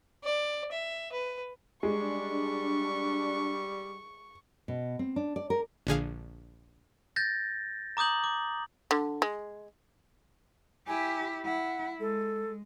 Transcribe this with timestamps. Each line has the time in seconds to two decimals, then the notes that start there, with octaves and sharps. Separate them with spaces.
0.24 D5
0.72 E5
1.12 B4
1.83 G3 G#3 D4 C#6
4.68 B2
4.99 C4
5.16 D4
5.36 D5
5.50 A#4
5.87 A#1 D3 G#4 F5
7.16 G6 A6 A#6
7.97 A#5 D6 D#6 G6 F#7
8.24 D6
8.91 D3
9.22 G#3
10.87 E4 G4 G#5
11.46 E4 F#5
12.00 G#3 A4